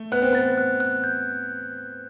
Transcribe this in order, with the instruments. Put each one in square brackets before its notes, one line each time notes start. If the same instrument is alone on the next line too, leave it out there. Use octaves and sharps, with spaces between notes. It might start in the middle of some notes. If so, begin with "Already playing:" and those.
Already playing: [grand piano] A3
[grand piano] B3 [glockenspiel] F#6
[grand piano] C4
[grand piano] B3 [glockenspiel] A6
[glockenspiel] F#6
F#6
G6